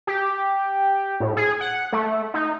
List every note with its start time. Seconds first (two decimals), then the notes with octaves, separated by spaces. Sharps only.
0.07 G4
1.20 A2
1.37 G#4
1.61 F#5
1.92 A3
2.34 D#4